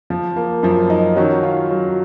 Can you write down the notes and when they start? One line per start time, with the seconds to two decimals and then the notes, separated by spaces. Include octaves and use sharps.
0.10 F3
0.36 A#3
0.63 F#2 F3
0.90 D#4
1.16 D#3 F#3 C#4
1.43 F4
1.70 F#3